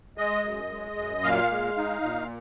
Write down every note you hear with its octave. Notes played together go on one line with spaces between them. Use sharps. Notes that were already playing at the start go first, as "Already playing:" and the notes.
G#3 D#5
F#2
G#3
F#2
A#2 F5
G#3
D#4
A#2